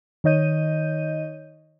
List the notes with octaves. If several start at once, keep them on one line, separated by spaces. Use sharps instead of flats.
D#3 D#4 C#5 D#5 G6 D#7